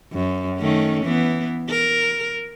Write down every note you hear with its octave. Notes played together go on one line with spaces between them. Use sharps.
F#2
D#3 A3 C#4
E3 B3
A#4